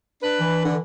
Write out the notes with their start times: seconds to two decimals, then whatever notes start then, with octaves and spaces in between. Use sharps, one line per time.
0.21 D4 B4
0.40 E3
0.64 D3